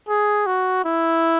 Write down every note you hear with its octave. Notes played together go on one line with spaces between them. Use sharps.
G#4
F#4
E4